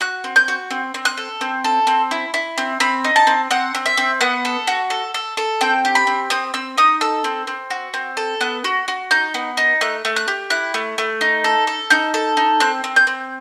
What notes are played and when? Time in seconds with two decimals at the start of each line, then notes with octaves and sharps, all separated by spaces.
0.01 F#4 F#6
0.24 C4
0.36 G6
0.48 F#4
0.71 C4
0.94 C4
1.05 F#6
1.18 A4
1.41 C4
1.64 A4
1.87 C4
2.11 E4
2.34 E4
2.58 C4
2.80 C4 B5
3.04 D#4
3.16 A5
3.27 C4
3.51 C4 F#5
3.75 C4
3.86 E5
3.97 C4
4.21 B3 F#5
4.45 A4
4.67 F#4
4.90 A4
5.14 A4
5.37 A4
5.61 C4 G5
5.85 G4
5.95 B5
6.07 C4
6.30 C4 D#6
6.54 C4 E6
6.78 D#4 D#6
7.01 A4 E6
7.24 C4
7.47 C4
7.70 F#4
7.94 C4
8.17 A4
8.41 B3 F#6
8.64 F#4
8.88 F#4
9.11 D#4 G6
9.34 B3
9.57 D#4
9.81 A3 F#6
10.05 A3
10.16 F#6
10.28 G4
10.50 E4 F#6
10.74 A3
10.98 A3
11.21 D#4
11.44 A4
11.67 A4
11.90 D#4 G6
12.14 A4
12.37 D#4
12.60 C4 F#6
12.84 C4
12.96 G6
13.07 C4